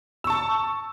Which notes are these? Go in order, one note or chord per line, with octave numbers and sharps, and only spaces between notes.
A5 C#6 E6